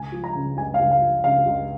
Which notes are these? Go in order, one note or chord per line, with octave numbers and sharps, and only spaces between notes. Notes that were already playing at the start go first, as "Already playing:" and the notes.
Already playing: C#2 G#5
F3
A#5
C#3
C#2 G#5
F5
C#2
F5
F3
C#3 F5
C#2